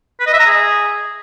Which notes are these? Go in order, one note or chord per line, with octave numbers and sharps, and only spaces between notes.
B4
D#5
E5
A#5
G#4